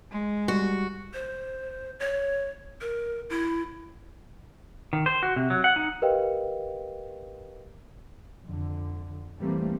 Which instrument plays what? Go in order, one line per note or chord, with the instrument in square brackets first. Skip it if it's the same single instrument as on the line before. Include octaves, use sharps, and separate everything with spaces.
[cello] G#3
[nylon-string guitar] G3 [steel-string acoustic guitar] F#4
[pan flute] C5
C#5
A#4
E4
[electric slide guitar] D#3
C5
F#4
C3
F#3
F#5
D#4
[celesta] G4 A#4 B4 D#5 F5 G5
[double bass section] F2 D3
E3 G3 A3 A#3 C4